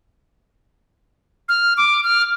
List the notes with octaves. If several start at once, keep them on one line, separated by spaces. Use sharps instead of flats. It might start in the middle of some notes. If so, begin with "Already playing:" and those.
F6
D6
F6